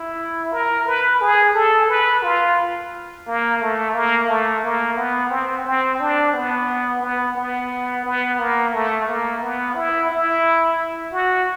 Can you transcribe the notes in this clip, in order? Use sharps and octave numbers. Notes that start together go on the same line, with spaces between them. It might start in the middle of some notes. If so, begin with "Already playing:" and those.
Already playing: E4
A#4
B4
G#4
A4
B4
F4
A#3
A3
A#3
A3
A#3
B3
C4
C4
D4
B3
B3
B3
B3
A#3
A3
A#3
B3
E4
E4
F#4